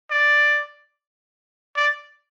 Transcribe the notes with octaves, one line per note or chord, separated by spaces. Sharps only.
D5
D5